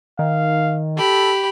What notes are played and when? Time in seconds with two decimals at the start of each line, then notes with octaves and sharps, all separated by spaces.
0.19 D#3 F5
0.97 G4 A4 B5